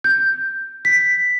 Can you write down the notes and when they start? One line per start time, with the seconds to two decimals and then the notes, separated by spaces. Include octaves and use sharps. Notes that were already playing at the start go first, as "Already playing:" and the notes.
0.04 G6
0.85 B6